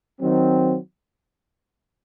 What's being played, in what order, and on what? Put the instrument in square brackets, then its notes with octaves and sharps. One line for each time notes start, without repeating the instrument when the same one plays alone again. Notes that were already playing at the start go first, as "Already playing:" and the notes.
[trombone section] D#3 F#3 C4